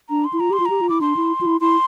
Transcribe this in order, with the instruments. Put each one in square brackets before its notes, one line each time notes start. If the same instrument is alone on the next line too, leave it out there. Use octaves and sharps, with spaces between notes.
[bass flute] D4 [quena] A#5
[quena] C6
[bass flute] E4
[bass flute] F4 [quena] A#5
[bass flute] G4 [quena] C6
[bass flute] F4
[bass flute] G4 [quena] A#5
[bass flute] F4
[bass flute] E4 [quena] D6
[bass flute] D4 [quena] C6
[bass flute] E4
F4
E4
[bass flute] E4 [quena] C6